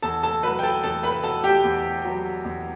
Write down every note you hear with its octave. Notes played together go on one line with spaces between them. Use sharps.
E2 A4 A5
A4 A5
F#3 B4 B5
G5
A4 A5
E2 A4 A5
B4 B5
B2 A4 A5
G4 G5
E2
F#3
E2